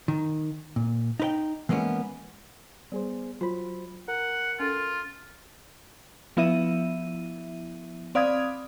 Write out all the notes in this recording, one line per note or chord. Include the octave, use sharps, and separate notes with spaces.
D#3
A#2
D#4 B4 G5
E3 G#3 A#3 B3 C#4
G3 B3 G#4 C5
F#3 F4 C5 B5
A#4 F#5
C#4 F4 A4
F3 B3 E4 E5 D#7
C4 D5 F5 B5 D#6 G#6